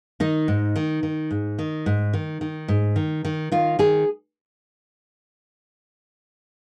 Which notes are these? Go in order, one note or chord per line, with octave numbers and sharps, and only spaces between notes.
D#3 D#4
G#2
D#3
D#3
G#2
D#3
G#2
D#3
D#3
G#2
D#3
D#3
D#3 F4
D#3 G#4